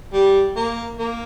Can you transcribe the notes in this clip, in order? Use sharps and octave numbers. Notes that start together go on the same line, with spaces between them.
G3
A#3
A#3